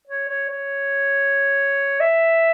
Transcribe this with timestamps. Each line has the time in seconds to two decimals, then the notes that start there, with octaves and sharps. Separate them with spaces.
0.08 C#5
0.29 C#5
0.50 C#5
2.00 E5